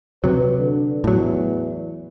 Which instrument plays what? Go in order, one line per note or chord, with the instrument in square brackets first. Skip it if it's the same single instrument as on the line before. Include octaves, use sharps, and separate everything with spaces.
[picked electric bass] C3 F#3 [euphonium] B4
[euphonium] D3
[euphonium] E2 [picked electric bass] A2 F#3